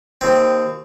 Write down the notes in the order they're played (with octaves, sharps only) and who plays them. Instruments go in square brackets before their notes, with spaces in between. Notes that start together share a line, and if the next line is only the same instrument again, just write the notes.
[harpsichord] D#2 C4